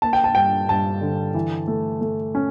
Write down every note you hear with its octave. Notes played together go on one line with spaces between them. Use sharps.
A#3 A5
G5
A5
G2 G5
G2 A5
D3
E3
A3
A3
C#4